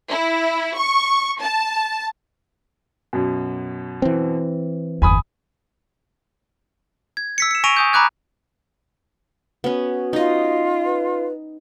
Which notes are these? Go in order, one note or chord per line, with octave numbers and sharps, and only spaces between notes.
E4
C#6
A5
F#2 B2
E3 C4
G1 E2 G#5 B5 D#6
G#6
E6 B6 C#7
C#7 E7
G#5 C#6 A#6 D7 D#7 F7
G#5 D#6 G6
A#5 B5 D6 F#6 G#6
B3 C#4 F#4
D#4 F4 D#5
B4